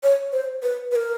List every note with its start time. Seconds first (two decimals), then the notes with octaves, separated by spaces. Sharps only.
0.03 C#5
0.32 C5
0.63 B4
0.92 B4
0.96 A#4